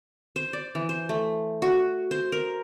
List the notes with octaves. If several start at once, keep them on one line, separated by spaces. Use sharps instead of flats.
C5
D5
E3
C5
A3
F#4
C5
A#4